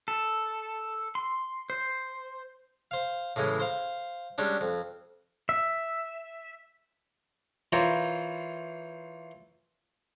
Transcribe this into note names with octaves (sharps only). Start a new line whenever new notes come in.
A4
C6
C5
C5 F5
A2 C#3 E3 G#3
C5 F5
G3 G#3 C#4 D4
F2
E5
E3 F4 A#4 C5 C#5